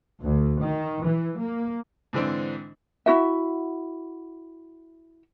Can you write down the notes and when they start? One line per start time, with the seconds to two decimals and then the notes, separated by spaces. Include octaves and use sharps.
0.23 D2
0.61 D#3
1.06 E3
1.39 A#3
2.13 G#2 D3 E3 C4 D4
3.06 E4 F#4 E5